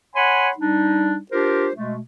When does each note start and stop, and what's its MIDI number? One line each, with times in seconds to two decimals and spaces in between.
0.16 0.51 73
0.16 0.51 78
0.16 0.51 80
0.16 0.51 83
0.16 0.51 84
0.58 1.18 55
0.58 1.18 62
0.58 1.18 63
1.32 1.70 62
1.32 1.70 65
1.32 1.70 67
1.32 1.70 70
1.32 1.70 72
1.75 1.98 47
1.75 1.98 56
1.75 1.98 57